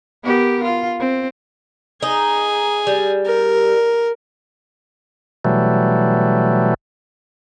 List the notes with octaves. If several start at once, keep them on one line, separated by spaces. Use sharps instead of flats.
B3 G4 A#4
F4
C4
D#4 G#4
G3
A#4
B2 E3 F#3 G3 A3